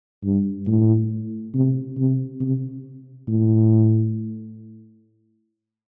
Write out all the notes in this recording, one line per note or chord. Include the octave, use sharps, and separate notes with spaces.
G2
A2
C3
C3
C3
A2